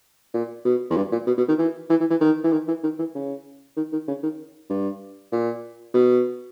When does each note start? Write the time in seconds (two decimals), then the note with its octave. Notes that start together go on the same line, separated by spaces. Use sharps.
0.34 A#2
0.65 B2
0.90 E2
0.96 G2
1.12 A#2
1.27 B2
1.37 B2
1.48 D#3
1.58 E3
1.90 E3
2.00 E3
2.10 E3
2.21 D#3
2.44 E3
2.52 D#3
2.68 E3
2.83 D#3
2.99 E3
3.15 C#3
3.77 D#3
3.92 D#3
4.08 C#3
4.23 D#3
4.70 G2
5.32 A#2
5.94 B2